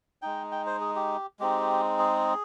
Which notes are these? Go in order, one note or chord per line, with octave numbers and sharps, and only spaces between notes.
G#3 D#4 G5
G5
C5
G#4
G4
G#3 C4 D#4 G4
G#4